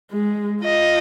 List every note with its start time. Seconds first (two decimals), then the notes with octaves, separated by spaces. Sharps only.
0.11 G#3
0.64 F4 D#5